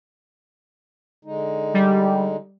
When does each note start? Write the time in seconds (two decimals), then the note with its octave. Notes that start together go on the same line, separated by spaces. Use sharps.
1.25 D3 G#3 D#4
1.74 G3